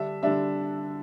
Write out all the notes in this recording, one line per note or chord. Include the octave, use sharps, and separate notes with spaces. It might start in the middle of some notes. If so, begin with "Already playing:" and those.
Already playing: D3 G3 D4 E5
D3 G3 D4 E5